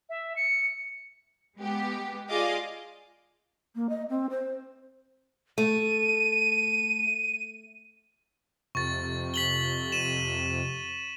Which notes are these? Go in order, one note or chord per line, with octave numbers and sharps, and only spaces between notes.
E5
C#7
G#3 B3 G4
F4 G#4 D5 D#5 F5 D6
A#3
D#5
C4
C5
A3 D#7
F2 C3 C#6 A6
B6 F#7 G7
D#7 E7